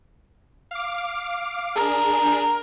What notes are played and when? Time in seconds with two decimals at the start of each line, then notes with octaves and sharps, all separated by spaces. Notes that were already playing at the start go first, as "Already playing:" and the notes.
0.71 F5 D6
1.76 D4 G#4 A#4